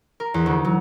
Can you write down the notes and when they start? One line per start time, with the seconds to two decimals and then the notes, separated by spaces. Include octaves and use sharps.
0.20 A#4
0.34 E2
0.46 D2
0.65 F#3